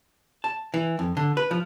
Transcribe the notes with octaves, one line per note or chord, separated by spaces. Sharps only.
A5
E3
F2
D3
B4
F3